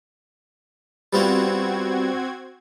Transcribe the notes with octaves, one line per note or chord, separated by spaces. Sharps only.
G3 B3 C4 F4 F#4 G#6